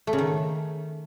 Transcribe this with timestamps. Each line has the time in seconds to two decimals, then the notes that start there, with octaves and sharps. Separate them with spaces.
0.07 A3
0.13 C#3
0.18 D#3